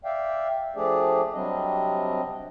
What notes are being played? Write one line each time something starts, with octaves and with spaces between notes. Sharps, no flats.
D5 E5 F5 G5
F3 A3 D4 G4 G#4 D5
C3 F#3 G3 C4 D4 D#5